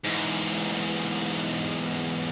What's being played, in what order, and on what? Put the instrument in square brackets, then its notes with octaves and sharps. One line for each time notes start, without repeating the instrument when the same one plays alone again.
[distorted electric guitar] E2 G#2